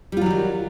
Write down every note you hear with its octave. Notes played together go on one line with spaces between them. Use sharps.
D#3 E3 F#3 G3 F4